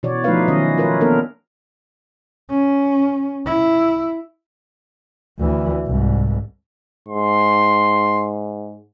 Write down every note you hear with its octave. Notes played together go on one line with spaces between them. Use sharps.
B2 E3 F#4 C#5 D5
F3 A3 D#4 F4 B4 F5
D#3 F#3 C#4 D#5
F4 A#4 B4 C#5
A#3 B3 D4 A4 A#4
C#4
E4
D2 E3
C2 G#2
G#2 C6